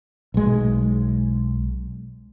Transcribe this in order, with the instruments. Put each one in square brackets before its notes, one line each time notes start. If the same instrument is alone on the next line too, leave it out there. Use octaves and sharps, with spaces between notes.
[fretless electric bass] B1 G#3